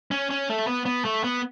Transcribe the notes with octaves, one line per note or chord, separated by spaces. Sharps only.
C#4
C#4
A3
B3
B3
A3
B3